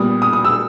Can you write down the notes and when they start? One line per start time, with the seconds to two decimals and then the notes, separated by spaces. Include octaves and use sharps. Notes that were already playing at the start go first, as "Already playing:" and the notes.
Already playing: A#2 G3 B3 D#6
0.22 D#6
0.33 D#6
0.44 E6